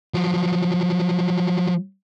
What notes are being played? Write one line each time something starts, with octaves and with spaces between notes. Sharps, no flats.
F3 F#3